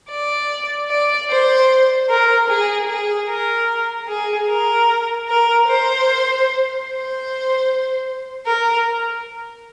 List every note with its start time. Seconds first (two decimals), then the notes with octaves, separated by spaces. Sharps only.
0.11 D5
0.90 D5
1.30 C5
2.10 A#4
2.49 G#4
2.89 G#4
3.29 A#4
4.08 G#4
4.49 A#4
5.28 A#4
5.68 C5
6.87 C5
8.46 A#4